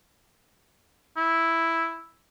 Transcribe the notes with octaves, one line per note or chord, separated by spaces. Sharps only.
E4